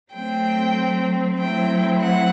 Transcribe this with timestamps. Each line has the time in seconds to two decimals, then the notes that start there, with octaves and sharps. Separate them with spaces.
0.12 F#3 A3 C4 G5
1.38 F#3 A3 C4 E4 G5
2.01 F#5